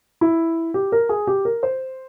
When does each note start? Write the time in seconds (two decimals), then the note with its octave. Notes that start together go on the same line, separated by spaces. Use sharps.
0.21 E4
0.74 G4
0.92 A#4
1.09 G#4
1.27 G4
1.45 A#4
1.63 C5